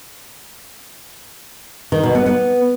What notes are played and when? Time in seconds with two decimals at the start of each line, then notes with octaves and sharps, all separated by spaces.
1.92 D#3
2.03 B2
2.15 B3
2.26 B3